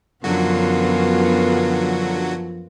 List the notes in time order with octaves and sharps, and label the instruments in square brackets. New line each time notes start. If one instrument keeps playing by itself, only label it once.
[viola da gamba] F#2 F4 [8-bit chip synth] D3 F#3 F#4 [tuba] F3 [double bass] B3